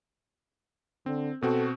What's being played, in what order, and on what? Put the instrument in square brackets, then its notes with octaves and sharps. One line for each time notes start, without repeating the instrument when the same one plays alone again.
[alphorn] D3 [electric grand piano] C4
[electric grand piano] B2 C4 F#4 [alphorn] A4